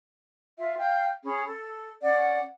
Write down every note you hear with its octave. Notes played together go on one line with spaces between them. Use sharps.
F4 E5
F5 G5 G6
C#4 G#4 B5
A4
C#4 D5 F#5